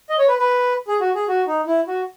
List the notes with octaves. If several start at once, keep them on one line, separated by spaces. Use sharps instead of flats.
D#5
C#5
B4
B4
G#4
F#4
G#4
F#4
D#4
E4
F#4